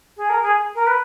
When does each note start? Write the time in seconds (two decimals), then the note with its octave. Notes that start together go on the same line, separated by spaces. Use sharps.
0.17 G#4
0.29 A#4
0.42 G#4
0.75 A#4
0.86 B4